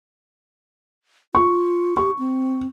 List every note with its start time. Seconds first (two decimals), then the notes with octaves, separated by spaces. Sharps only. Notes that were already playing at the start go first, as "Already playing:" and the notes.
1.35 F4 C#6
1.97 G4 C#6
2.19 C4